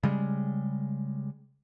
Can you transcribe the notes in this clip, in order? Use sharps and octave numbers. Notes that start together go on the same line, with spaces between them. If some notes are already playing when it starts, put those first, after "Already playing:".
C#3 G3 G#3